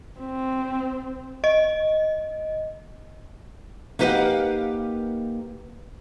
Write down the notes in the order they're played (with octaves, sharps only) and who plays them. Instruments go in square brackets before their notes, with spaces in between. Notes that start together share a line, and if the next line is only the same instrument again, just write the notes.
[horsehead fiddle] C4
[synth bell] D#5
[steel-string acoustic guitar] A#3 D#4 G4 B4 F5 F#5